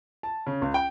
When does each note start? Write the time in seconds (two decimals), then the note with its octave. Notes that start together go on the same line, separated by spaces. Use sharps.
0.23 A5
0.47 C#3
0.62 C#2
0.74 G5